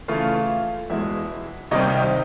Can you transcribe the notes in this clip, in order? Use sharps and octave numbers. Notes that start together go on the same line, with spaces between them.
C#3 E3 A3 F4 F5
E2 B2 G#3 E4 E5
C2 C3 D#3 G3 C4 D#4 D#5